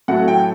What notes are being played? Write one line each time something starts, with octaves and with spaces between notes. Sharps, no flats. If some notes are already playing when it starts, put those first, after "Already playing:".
A2 F#3 A3 F#5
G5